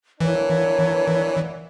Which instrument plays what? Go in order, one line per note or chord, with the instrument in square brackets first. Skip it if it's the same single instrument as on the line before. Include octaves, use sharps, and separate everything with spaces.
[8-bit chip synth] E3 [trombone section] A#3 B3 D4 [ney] C#5